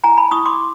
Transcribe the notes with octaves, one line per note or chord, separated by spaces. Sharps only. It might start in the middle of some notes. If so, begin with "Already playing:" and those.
E4 G#5 A#5
A5 B5
E4 C#6 D#6
C6 D6